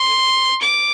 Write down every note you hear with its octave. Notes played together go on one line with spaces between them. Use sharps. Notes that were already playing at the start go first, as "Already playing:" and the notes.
Already playing: C6
D6